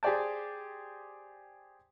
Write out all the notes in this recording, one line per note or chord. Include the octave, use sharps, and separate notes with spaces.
G4 G#4 C5 D5 G5 A5